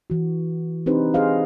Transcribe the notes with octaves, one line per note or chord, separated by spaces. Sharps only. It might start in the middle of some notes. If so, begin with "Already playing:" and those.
E3 F#4
C4 D4 D#4 G4 B4 C5
G#4 C5 D#5 F5